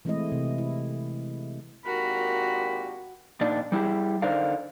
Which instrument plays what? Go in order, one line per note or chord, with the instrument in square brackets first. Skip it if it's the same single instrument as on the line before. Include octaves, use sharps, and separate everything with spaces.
[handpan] E3 G#3 A3 C4 E4 D#5
C3
E4
[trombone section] G#1 A#2 G4 [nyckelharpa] F#4 A#4 [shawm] B5
[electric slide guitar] A#2 A#3 D4 D#4 D5
G3 E4 G4 G#4
D3 D#4 A#4 C5 D5 F5